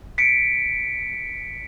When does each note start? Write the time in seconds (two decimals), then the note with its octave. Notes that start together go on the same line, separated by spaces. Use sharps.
0.18 B6 C#7 D7